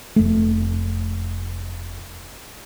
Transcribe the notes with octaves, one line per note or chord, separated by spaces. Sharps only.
F1 A3